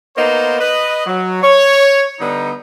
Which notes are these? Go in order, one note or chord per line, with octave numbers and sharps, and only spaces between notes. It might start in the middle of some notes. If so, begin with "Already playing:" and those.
A#3 B3 D#4 C5
B4 D#5
F#3
C#5
D3 G3 B3 D#4